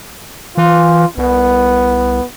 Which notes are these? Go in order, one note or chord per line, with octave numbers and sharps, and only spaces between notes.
E3 F4
C2 B3